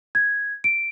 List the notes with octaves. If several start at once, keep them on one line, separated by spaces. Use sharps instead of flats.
G#6
D7